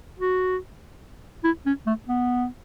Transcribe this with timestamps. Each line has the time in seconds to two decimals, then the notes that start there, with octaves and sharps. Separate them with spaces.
0.19 F#4
1.44 E4
1.66 C#4
1.86 A3
2.08 B3